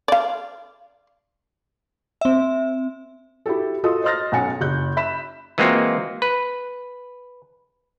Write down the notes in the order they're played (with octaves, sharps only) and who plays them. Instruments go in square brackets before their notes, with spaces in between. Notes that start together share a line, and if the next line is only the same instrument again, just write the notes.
[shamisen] D5 F5
[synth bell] C4 E5
[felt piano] E4 F#4 G4 A4
F4 F#4 A4 D#5 D#6
C5 D#5 C6 F6 A6 A#6
B1 C#4 F#5 G#5 A6 C#7
F#1 D#4 F#6 G6
E5 B5 B6 E7
[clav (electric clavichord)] E3 G#3 A#3 C4 F4 F#4
B4